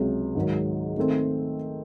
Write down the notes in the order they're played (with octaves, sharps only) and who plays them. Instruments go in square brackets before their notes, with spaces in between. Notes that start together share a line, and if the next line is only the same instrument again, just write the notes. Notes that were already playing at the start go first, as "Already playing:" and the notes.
Already playing: [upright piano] C#2 C3 F#3
G#2 D#3 F#3
D#3 A3 C4